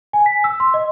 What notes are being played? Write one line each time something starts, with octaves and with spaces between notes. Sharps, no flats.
G#5
B6
E6
C6
D#5